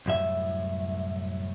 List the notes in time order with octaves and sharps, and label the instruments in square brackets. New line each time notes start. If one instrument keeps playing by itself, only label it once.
[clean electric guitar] C2 F#2 A2 E5